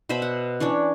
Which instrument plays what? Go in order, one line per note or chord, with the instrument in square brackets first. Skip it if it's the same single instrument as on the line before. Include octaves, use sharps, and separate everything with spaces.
[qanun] B2 C5 E5 B5
F#5
E3 C#4 D4 C#5